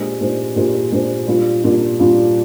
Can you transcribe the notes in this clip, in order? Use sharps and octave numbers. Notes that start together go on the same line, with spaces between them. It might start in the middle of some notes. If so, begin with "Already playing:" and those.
Already playing: A#2 G#3 D4 G4 C5
A#2 G#3 D4 G4 C5
A#2 G#3 D4 G4 C5
A#2 G#3 D4 G4 C5
A#2 G3 D4 F4
A#2 G3 D4 F4
A#2 G3 D4 F4